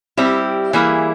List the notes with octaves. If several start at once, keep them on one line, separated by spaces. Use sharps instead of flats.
G3 C4 E4 G4
E3 G3 A#3 E4 G#4